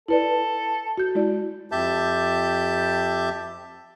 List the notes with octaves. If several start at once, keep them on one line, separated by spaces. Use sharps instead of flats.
E4 A4 B4 D5
F#4 G6
G#3 E4 D5
F2 G4 E5 A5 G6